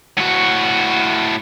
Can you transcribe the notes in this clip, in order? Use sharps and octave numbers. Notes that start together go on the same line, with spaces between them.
A2 F#4